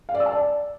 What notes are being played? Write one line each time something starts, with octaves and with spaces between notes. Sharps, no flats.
F5
D5
E6
A5
D5